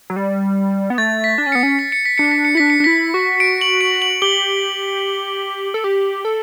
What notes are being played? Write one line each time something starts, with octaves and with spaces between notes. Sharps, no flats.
F#3
G3
B3
A3 A6
B6
D4
C#4
B3 C#7
C#4
B6
C#7
B6
D4 C#7
B6
C#7
D4 E4 B6
C#7
D4
E4 B6
F#4
D7
F#7
D7
F#7
G4 G7
A4
G4
A4